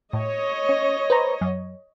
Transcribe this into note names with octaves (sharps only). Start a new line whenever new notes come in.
A2 C#5 D#5
C#4
B4 C5 A#5
F#2